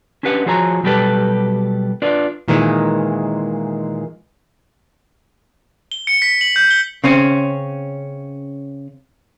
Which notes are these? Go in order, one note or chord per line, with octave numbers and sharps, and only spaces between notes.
C#4 D4 G4 B4 F#5
F3 F4 F#4 G#4 C#5 A#5
B2 F#3 G3 G4 A4 B4
D4 F4 B4 D5
A#2 D#3 E3 G#3
G7
C#7
B6
F#7
G6
G7
C#3 C4 C#4